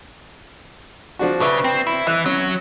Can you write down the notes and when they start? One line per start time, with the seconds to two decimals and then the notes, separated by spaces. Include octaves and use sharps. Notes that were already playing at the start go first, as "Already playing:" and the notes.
1.19 F3 D4 F#4
1.41 C#3 B4 D5 E5
1.64 C4
1.87 E4
2.07 E3 E5 F#6
2.26 F#3 C#4